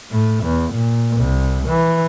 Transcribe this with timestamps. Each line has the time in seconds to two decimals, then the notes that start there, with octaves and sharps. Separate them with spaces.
0.11 A2
0.44 E2
0.74 A#2
1.17 C2
1.68 E3